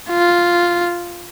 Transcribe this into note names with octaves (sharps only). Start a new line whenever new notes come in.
F4